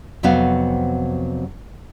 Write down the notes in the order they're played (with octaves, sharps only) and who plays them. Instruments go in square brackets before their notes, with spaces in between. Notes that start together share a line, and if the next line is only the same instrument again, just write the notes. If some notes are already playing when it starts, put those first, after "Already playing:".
[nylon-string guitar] F2 C3 F#3 B3 F#4 F5